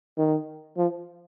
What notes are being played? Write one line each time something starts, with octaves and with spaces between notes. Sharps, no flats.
D#3
F3